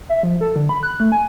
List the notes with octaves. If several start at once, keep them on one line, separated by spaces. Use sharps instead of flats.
E5
F3
A4
D3
B5
F#6
A3
G#5